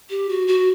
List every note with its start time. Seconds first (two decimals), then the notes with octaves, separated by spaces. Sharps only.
0.10 G4
0.29 F#4
0.48 F#4